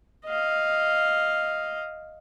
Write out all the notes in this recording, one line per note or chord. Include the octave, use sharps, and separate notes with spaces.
D#5 F5